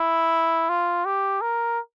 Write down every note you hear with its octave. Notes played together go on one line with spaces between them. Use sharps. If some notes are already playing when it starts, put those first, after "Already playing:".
Already playing: E4
F4
G4
A#4